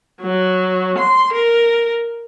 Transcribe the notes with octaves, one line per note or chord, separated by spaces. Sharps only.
F#3
C6
A#4